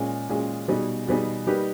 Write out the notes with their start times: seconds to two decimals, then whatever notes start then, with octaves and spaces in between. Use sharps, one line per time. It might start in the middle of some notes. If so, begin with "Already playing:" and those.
Already playing: A#2 G#3 C#4 G#4
0.29 A#2 G#3 C#4 G#4
0.68 B2 G3 B3 D#4 G#4
1.07 B2 G3 B3 D#4 G#4
1.47 G3 A#3 D#4 G4 B4